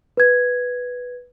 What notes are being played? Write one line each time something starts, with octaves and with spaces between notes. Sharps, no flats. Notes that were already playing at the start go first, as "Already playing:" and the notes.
B4 G#6